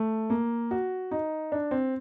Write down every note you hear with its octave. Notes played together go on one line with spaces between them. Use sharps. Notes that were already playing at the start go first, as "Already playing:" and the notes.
Already playing: A3
A#3
F#4
D#4
D4
C4